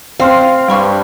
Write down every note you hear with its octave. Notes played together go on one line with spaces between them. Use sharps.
C4 F5 C6 F6
G2 G3 B5 C#6